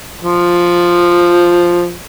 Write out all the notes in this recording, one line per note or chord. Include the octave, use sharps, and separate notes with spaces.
F3